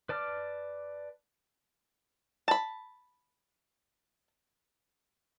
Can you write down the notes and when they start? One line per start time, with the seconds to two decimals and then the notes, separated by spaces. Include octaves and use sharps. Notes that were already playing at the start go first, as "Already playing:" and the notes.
0.09 B4 D5 A5 D6 F6
2.48 A5 B5